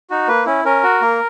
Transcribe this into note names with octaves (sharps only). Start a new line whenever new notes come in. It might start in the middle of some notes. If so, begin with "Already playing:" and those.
D#4 F#4
A#3 B4
C#4 E4
C#4 A#4
F#4
A#3